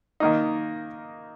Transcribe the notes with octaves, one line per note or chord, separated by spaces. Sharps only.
D#3 A#3 D#4